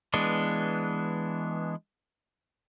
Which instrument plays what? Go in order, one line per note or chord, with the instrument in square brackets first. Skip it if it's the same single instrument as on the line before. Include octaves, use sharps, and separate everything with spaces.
[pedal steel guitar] E3 G#3 B3 D4